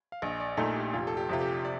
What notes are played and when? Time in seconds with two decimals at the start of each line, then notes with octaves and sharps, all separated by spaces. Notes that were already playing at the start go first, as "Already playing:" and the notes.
0.12 F5
0.22 A#1 D#5
0.40 D5
0.57 A#2 A3 D#4 A4
0.76 G4
0.93 F1 F4
1.07 A4
1.17 G4
1.29 F2 C3 F4
1.41 G4
1.65 D5